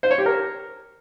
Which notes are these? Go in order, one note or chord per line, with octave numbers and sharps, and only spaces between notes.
C5
C#5
G4
A#4